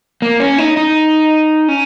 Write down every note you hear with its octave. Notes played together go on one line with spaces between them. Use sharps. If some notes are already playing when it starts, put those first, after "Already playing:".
A#3
C#4
D#4
D#4
C#4